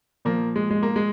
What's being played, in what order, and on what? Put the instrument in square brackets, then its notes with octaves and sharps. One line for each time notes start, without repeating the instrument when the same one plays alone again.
[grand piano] A#2 F3 A#3
G#3
G#3
A#3
G#3